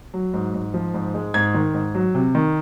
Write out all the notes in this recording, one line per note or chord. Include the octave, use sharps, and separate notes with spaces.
F#3
G#2
G#2
F3
G#2
G#3
G#2 G#6
D#3
G#2
F#3
C3
D#3